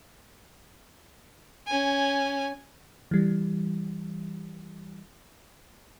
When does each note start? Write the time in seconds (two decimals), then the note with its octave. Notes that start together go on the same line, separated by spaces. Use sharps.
1.67 C#4 G#5
3.11 E3 G3